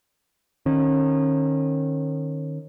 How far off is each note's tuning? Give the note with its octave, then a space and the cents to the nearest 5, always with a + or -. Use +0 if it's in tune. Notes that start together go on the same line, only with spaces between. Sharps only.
D#3 -25 C#4 -35